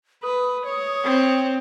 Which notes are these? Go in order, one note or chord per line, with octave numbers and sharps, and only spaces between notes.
B4 D#6
C#5
C4